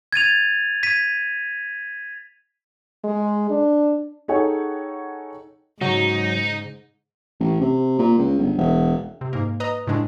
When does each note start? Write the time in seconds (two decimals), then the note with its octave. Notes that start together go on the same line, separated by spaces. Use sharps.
0.13 G#6 A6 D#7 F7
0.83 G#6 B6 D#7
3.04 G#3
3.50 D4
4.28 D#4 G#4 A4 C#5 F#5 G5
5.81 G#2 C#3 F#3 D#4
7.40 A1
7.61 C3
7.99 A#2
8.18 C#2
8.39 G1
8.58 E1
9.21 C3
9.33 G#2 A#3
9.60 B4 D#5 A#5 D#6
9.87 A2 C#3 G#3 D4